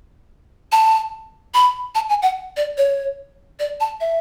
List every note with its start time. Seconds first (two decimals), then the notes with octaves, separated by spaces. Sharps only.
0.72 A5
1.54 B5
1.95 A5
2.09 G#5
2.22 F#5
2.57 D5
2.78 C#5
3.59 D5
3.80 A5
4.00 E5